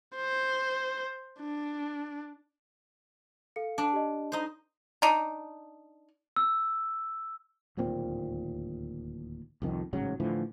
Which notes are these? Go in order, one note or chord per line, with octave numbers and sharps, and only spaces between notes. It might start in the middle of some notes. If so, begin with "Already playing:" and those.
C5
D4
A4 F5 C#7
D4
G4 D#5
D#4 C5
D4 D#4
E6
D1 D#2 A#2 C4
C2 F2 D#3
A1 G#2 C#3 F#3
A2 D3 E3 F3